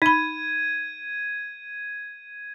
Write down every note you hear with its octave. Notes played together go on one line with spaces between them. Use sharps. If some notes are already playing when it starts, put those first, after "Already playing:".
D#4 B5 G#6 D#7